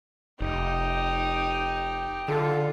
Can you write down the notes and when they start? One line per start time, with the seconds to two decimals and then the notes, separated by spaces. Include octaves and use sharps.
0.41 F1 D#4 G4
2.28 D3 F4 A4